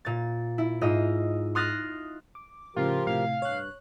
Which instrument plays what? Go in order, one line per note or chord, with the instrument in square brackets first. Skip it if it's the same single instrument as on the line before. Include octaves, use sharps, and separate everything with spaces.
[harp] A#2 A6
E4
G#2 F4 D#5 E6
C6 D#6 F6 F#6 A6 A#6
[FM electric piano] D6
[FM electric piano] A2 C#3 [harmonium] F3 G4 A#4 [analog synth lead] F4
[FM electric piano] A2 C3 [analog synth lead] F5
[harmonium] G2 [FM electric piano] C#5 F#6